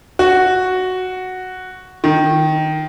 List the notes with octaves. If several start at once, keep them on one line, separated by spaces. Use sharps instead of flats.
F#4
D#3